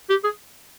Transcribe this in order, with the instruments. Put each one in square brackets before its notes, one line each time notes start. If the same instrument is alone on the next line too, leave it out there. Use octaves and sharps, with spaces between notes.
[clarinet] G4
G#4